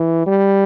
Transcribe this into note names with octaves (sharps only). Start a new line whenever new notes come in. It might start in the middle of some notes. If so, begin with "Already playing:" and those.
Already playing: E3
G3